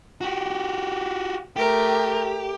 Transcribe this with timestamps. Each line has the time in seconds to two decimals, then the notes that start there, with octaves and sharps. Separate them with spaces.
0.21 F#4 G4
1.56 A3 G4 A#4